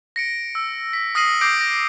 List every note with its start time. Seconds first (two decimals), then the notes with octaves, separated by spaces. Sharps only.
0.16 A#6 C#7 D7
0.55 E6
0.93 B6
1.15 D#6 F6 A#6 C7 D#7 F#7
1.41 D6 D#6 G6 A#6 C7 D7
1.61 A#6